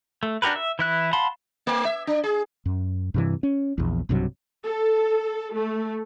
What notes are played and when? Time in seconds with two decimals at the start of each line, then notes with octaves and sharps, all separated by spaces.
0.23 A3
0.42 D4 F#4 G4 A#4 B4
0.56 E5
0.79 E3 E4 F#6
1.13 F5 F#5 A5 B5 C6
1.67 A3
1.85 E5
2.07 D4
2.24 G#4
2.66 F#2
3.14 G2 C3 E3
3.43 C#4
3.78 A#1 E2
4.09 B1 G2 C3 F#3
4.65 A4
5.54 A3